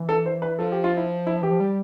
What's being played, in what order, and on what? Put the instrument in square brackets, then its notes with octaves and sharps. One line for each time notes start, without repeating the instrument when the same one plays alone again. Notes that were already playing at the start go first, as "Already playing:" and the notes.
Already playing: [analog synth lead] E3
[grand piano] A4
C5
B4
[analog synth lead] F3 [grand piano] A4
[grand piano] G4
F4
E4
E4
[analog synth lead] E3 [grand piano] G4
[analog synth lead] F3
G3